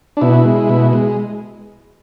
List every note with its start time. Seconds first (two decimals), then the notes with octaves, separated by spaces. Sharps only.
0.17 D4
0.21 B2 E4
0.45 G#3
0.69 B2
0.93 G#3